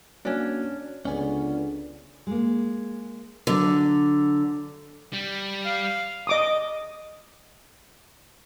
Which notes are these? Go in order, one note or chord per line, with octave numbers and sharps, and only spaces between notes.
A#3 C#4 D4 F#4 C#5
C#2 D3 B3 C#4 D5 G#5 C#6
G#3 A#3
D3 F#3
G3
F5
D#5 D6 D#6